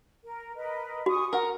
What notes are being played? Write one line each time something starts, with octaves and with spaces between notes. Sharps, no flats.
A#4
A#4 B4 D#5
F#4 G#5 C#6 D#6
A#4 F#5 A#5